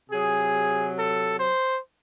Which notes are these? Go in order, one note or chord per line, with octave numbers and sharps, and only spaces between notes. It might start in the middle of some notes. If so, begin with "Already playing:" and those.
C3 F#3 G#4
A4
C5